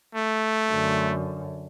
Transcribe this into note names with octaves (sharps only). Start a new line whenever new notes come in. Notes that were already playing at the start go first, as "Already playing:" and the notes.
A3
F#2 D3